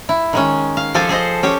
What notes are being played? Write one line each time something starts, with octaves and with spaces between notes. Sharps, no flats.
E4
D#3 G#3 C#4
F5
F3 G4 A4 C5 G#5 A5
G#4 A4 C5 D#5
C#4 G4 C#5